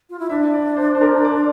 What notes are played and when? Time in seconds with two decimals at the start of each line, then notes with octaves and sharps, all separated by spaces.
0.10 F4
0.19 E4
0.30 D4 E5
0.54 D5
0.76 C5
0.95 C5
1.01 A#4
1.25 D5